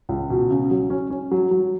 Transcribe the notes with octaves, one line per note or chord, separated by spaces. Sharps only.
C#2
B2
C#3
F#3
C#4
C#4
F#3
F#3